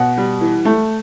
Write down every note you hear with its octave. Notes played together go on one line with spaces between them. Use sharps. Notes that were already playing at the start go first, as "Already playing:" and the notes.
Already playing: B2 F#5
G3
E3
A3